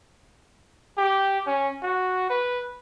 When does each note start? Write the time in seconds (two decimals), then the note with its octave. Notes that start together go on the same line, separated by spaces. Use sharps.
0.98 G4
1.46 C#4
1.82 F#4
2.29 B4